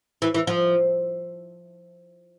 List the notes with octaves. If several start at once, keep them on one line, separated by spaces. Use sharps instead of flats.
E3
E3
F3